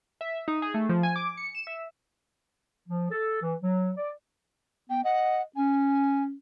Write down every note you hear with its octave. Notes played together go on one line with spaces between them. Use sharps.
E5
D#4
G#4
A3
F3
G#5
D6
C#7
E7
E5
F3
A4
E3
F#3
D5
B3 G5
D#5 F#5
C#4 G#5